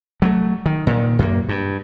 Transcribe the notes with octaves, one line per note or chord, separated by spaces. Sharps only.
F#3 G3 A3
D#3
A#2 D#3
F#2 A#3
G2